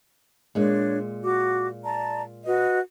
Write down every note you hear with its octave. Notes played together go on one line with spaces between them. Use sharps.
A#2 G#3 D4 C#5
F#4 D6
D5 A5 A#5
F#4 B4 D#5